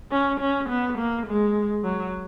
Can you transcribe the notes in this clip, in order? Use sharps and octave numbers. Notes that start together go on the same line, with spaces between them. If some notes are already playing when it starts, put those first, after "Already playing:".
C#4
C#4
B3
A#3
G#3
F#3